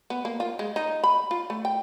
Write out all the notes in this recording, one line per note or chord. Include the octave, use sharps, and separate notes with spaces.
B3
A#3
F4
G#3
D#4
B5
F4
A3
G5